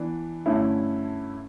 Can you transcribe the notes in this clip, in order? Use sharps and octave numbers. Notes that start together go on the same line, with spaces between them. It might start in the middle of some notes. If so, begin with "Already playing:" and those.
Already playing: E3 B3 D4
G2 D3 A3 C#4 E4